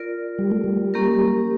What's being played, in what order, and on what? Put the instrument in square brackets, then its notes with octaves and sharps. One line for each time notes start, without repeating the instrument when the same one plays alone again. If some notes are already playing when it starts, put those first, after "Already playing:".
Already playing: [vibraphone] F4 A#4 D5
[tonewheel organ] G3
A3
G3
[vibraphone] A#3 C#4 G4 A#4